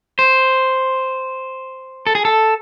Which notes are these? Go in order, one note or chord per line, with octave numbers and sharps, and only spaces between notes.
C5
A4
G#4
A4